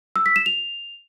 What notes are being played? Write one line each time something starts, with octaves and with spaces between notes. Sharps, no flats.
E6
B6
E7
F7